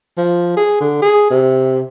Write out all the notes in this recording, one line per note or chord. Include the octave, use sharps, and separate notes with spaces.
F3
G#4
D3
G#4
C3